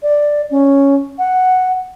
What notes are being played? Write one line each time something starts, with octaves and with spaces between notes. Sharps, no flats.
D5
C#4
F#5